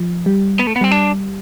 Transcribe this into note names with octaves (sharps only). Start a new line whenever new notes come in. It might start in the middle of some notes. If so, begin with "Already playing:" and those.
Already playing: F3
G3
B3
A3
B3
G3 C4
D4